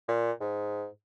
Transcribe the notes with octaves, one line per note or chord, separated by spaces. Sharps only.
A#2
G#2